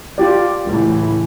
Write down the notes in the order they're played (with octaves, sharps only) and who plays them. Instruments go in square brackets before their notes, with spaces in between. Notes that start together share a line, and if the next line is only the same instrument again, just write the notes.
[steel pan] F4 G4 D5
[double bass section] C#2 A2 E3